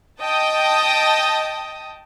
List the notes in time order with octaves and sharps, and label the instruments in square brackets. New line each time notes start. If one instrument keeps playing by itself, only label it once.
[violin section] D#5 G5 A5 D#6